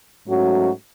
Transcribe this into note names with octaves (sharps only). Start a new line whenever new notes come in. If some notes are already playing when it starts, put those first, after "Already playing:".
G#2 F#3 A3 C#4 F#4